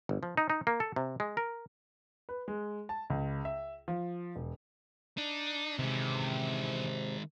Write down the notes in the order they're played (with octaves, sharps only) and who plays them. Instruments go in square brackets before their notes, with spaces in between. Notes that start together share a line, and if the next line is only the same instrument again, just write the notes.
[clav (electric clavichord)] G1
F3
D#4
D#4
A#3
A4
C3
G#3
A#4
[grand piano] B4
G#3
A5
C#2
E5
F3
E1
[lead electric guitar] D4 [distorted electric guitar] D#4
[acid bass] C3 [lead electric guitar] D#3 G#3 [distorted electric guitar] E3 C#4